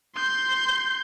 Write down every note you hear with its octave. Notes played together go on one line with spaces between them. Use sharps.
C6 G6